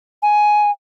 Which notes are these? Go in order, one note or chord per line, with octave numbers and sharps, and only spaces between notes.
G#5